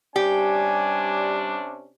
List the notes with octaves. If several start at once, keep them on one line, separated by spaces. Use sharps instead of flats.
C3 G3 C#4 D4 G4 G#5